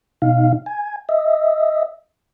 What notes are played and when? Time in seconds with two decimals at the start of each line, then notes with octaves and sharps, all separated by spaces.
0.22 B2 D#4 F5
0.66 G#5
1.09 D#5 E5